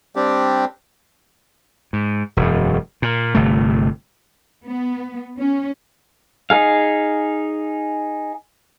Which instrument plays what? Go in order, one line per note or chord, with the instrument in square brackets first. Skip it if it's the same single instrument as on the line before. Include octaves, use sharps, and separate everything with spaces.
[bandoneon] G3 C4 D4 G4
[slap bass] G#2
E1 F#2
A#2
G1 C3 A3
[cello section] B3
C#4
[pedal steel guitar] D#4 G#4 F5